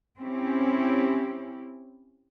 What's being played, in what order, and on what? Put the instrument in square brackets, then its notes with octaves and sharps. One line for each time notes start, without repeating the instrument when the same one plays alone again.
[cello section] C4 C#4 E4 G4